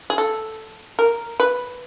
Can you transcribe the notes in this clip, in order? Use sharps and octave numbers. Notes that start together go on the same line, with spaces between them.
G#4
A4
A#4
B4